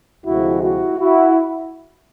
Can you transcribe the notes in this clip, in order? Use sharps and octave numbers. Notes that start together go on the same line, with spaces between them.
D2 C3 F3 G#3 E4 F#4
E4 F#4
E4 F#4